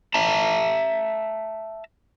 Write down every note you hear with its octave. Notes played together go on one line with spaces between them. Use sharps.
E5 A5 A#5